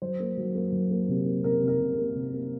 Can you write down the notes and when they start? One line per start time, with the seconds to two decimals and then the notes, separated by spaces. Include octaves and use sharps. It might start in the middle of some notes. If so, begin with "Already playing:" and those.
0.02 F#3 C5
0.20 A#3
0.37 F#3
0.55 A#3
0.73 F#3
0.91 A#3
1.09 C3
1.26 A#3
1.44 C3 A#4
1.62 C3
1.68 A#4
1.80 C3
1.98 A#3
2.15 C3
2.33 A#3